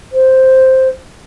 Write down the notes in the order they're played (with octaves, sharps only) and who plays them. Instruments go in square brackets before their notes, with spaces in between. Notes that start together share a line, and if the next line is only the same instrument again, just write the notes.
[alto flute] C5